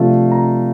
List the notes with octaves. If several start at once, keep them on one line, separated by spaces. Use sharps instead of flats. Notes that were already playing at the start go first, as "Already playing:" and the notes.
Already playing: C3 F3 A3 D4 F4
A#5